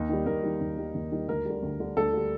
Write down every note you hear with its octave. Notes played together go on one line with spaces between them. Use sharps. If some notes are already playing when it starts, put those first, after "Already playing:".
Already playing: D#2 D#4
D#3 G3
D#2 A#4
D#3 G3
D#2
D#3 G3
D#2
D#3 G3
D2 A#4
D3 G3
D2
D3 G3
D2 A4
D3 G3